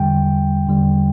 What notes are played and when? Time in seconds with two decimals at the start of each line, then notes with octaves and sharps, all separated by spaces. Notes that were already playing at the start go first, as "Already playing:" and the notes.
Already playing: E2 D3 G3 G5
0.67 E2 D3 G3